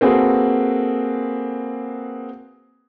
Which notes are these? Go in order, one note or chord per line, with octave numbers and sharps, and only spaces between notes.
A#3 C4 F#4 G#4 A4 B4